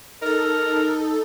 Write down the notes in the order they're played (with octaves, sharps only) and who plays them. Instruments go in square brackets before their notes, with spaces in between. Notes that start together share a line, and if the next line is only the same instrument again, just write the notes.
[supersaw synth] D#4 A4 [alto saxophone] A#4